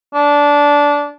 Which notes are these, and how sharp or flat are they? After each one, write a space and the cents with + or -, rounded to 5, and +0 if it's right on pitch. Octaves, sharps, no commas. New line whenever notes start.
D4 -15